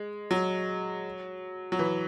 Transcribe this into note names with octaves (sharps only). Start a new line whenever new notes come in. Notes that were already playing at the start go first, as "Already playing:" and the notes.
Already playing: G#3
F#3
F#3
E3